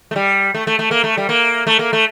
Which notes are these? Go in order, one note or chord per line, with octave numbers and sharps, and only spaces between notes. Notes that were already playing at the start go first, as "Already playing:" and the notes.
A3
G3
A3
A3
A3
A#3
A3
G3
A#3
A3
A#3
A3